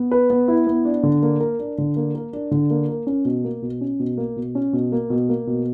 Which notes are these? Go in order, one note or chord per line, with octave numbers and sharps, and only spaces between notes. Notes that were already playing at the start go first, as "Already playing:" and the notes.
Already playing: B3
B4
B3
E4
B3
D4
D3
A#3
A#4
D4
D3
A#3
A#4
D4
D3
A#3
A#4
C#4
B2
A#3
B2
C#4
B2
A#3
B2
C#4
B2
A#3
B2
A#3
B2